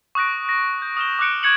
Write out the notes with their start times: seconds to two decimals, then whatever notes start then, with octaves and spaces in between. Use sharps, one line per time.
0.15 C#6 D#6 F#6 A#6 D7
0.49 A#6
0.82 G6
0.97 D#6 F6 E7 G7
1.19 D6 D#6 F#6 C#7 D7
1.43 C#6 F#6 G#6 C#7 F#7